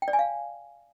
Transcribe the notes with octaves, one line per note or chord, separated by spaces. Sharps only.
G5
D5
G#5
F5